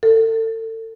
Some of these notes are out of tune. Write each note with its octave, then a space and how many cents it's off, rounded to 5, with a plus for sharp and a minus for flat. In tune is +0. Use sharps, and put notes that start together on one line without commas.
A4 +30